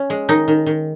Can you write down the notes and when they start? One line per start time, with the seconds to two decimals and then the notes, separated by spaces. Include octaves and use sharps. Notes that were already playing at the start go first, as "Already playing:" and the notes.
Already playing: C#4
0.10 G#3
0.29 D#3 D#4
0.48 D#3
0.66 D#3